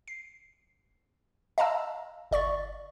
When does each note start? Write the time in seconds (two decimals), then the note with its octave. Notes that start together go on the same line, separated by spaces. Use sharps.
0.08 C7
1.58 D#5 F5 A5 A#5 E6
2.31 G1 D5 C#6 A6